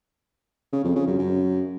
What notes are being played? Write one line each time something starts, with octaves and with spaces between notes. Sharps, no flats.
C#3
F2
C#3
F#2
F#2